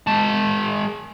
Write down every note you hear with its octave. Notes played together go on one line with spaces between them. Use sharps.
G#3 A5